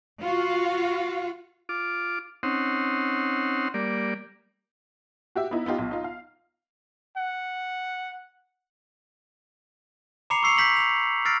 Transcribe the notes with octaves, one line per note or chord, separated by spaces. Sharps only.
F4 F#4 F5
F4 D6
C4 C#4 D#4 F#5 C6
G3 A#3 D5
F#4 G4 E5
B3 D#4 E4
B3 D#4 F4 G4
B1
D#4 F4
F5
F#5
A#5 B5 D6 C7 C#7 F7
C#6 E6 C7 C#7 F7
G6 B6 F#7
F7
E6 F6 A6 A#6 C7 D7